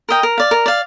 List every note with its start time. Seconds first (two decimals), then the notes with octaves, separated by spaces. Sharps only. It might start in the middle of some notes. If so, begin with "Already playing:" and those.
0.09 A#4 D#5 G5
0.23 A#4
0.38 D5 F5
0.51 A#4
0.66 D5 F5